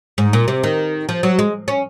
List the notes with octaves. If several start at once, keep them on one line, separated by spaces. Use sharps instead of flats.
G#2
A#2
C3
D#3
F3
F#3
G#3
C#4